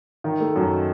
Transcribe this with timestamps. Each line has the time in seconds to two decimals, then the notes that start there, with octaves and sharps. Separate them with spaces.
0.24 D#3
0.40 A3
0.56 F#2